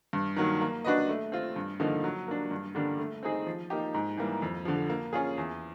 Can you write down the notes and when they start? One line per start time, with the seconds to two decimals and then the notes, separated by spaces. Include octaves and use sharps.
0.13 G2
0.36 D#3 F#3 A#3
0.61 A#3
0.84 D4 F#4 B4 D#5
1.09 A3
1.32 C4 F4
1.56 G2
1.80 D3 F3 A#3 D#4
2.04 F#3
2.28 A#3 D4
2.51 G2
2.75 D3 G3 A#3 D4
2.99 A3
3.23 C4 D#4 G#4
3.46 F3
3.70 A#3 D#4 G4
3.94 G#2
4.17 E3 G3 A#3
4.42 F2
4.65 D3 F3
4.90 A#3
5.13 C#4 F4 G#4
5.38 E2